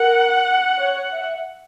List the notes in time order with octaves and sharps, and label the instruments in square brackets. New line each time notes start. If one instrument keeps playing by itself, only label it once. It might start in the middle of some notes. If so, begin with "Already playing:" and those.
Already playing: [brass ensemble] A#4 [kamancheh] F#5
[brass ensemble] C#5
E5